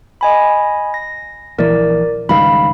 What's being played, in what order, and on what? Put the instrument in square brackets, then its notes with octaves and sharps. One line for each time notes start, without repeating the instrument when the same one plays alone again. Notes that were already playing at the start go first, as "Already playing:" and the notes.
[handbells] D#5 G#5 B5
A#6
[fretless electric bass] A#1 E3 [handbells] A#4 D5
[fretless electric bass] C#2 G2 D#3 [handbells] F5 B5